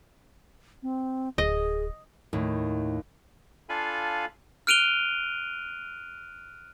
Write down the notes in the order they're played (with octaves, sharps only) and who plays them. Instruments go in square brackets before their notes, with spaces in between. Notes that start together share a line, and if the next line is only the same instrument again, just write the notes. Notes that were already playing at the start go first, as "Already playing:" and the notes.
[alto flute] C4
[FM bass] D1 [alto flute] G#4 [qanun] D#5
[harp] D#2 [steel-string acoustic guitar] A2
[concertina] D4 F4 A4 F5 G#5 B5
[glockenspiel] F6 F#6 D7 D#7 F7 G7